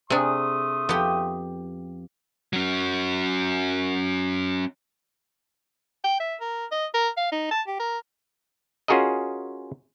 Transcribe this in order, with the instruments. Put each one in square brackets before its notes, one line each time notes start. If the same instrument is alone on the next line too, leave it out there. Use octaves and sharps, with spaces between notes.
[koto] C3 D4 [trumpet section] A3 C6 D#6 [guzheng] G#4
[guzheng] F2 G4 [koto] B3
[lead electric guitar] F#3 C#4
[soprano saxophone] G5
E5
A#4
D#5
A#4
F5
D#4
A5
G4
A#4
[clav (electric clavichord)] C#4 F4 F#4 G#4 A#4 D#5